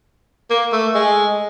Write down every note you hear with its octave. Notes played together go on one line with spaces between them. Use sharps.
A#3
A3
G#3